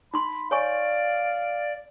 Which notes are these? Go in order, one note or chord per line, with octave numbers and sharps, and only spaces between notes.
D#4 B5 C6
C#5 D5 F5 G#5 C#6